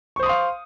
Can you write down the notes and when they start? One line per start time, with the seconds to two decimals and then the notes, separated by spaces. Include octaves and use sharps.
0.16 C#6
0.19 C5
0.23 D#6
0.26 C6
0.29 F5